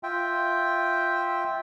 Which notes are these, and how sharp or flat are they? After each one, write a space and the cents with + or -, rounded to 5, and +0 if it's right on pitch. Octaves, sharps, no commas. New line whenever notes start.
F4 +0 E5 -10 G5 +0